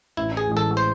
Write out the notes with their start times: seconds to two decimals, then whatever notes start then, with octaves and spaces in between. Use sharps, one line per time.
0.17 A1 E4
0.37 G#4
0.47 A2 E3 G#3
0.57 A4
0.77 C5